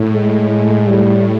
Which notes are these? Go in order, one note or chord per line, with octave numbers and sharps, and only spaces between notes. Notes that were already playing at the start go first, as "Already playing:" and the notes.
Already playing: A2
G#3
A2 G3